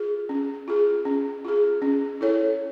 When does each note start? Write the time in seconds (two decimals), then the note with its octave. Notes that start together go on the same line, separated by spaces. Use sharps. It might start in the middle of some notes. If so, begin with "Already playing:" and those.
Already playing: F4 G#4
0.29 C#4
0.68 F4 G#4
1.05 C#4
1.45 F4 G#4
1.82 C#4
2.21 E4 A4 C#5